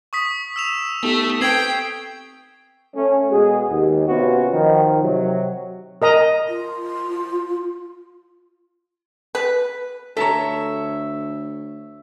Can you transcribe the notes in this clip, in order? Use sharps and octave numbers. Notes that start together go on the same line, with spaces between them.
C#6 D#6 B6
E6 E7 F7
A3 B3 D#4 G4
C4 A4 B4 G5 G#6 C7
A3 C#4
B2 G#3 F#4 G#4
D#2
C3 B3 C#4 F4 F#4 B4
D#3 F3
C3 F#3
A#4 D#5 A#5
F4
B4
D2 A4 C#5 E5 A5 A#5